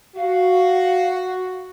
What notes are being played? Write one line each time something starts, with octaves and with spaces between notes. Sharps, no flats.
F#4 F5